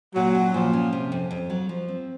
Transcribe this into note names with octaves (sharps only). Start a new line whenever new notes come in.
A#2 F#3
C#4
A#2 F3
C#4
C3
F2
F2
F#3
F3
C4